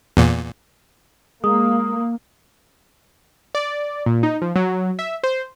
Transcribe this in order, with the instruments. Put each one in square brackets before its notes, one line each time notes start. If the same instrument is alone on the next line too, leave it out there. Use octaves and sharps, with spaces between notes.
[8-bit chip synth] E2 A#2
[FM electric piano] G#3 [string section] A#3 [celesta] D#6
[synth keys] D5
A#2
D#4
F3
F#3
E5
C5